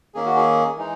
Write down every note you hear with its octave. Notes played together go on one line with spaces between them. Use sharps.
D#3 A#3 C#4 G#4
F#4
G#4
E3 G#3 D#4